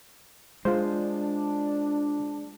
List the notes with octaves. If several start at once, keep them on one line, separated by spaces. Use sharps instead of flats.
G#3 D4 F4 C5